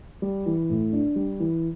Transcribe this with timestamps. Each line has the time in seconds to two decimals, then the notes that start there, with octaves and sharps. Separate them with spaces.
0.22 G3
0.46 E3
0.70 A2
0.93 D4
1.16 G3
1.40 E3